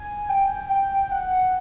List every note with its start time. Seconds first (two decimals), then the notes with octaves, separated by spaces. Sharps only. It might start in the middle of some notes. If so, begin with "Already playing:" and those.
Already playing: G#5
0.29 G5
0.70 G5
1.11 F#5